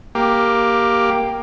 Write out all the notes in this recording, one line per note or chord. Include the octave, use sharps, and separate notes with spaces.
A#3 G4